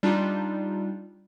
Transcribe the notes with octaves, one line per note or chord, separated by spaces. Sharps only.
G3 D4 D#4 F4